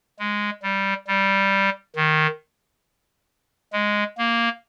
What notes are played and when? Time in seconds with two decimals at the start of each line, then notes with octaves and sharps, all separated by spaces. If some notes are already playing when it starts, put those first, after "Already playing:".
0.19 G#3
0.63 G3
1.08 G3
1.96 D#3
3.73 G#3
4.18 A#3